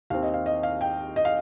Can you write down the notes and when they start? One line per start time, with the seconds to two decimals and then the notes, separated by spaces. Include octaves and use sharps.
0.10 D#2 D#3 C4 F5
0.23 D#5
0.34 F5
0.46 D#5
0.63 F5
0.81 G5
1.16 D#5
1.25 F5